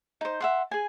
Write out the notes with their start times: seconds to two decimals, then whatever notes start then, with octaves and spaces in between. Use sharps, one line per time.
0.21 D#4 C5
0.40 E5 F#5 C6
0.71 G#4 G#5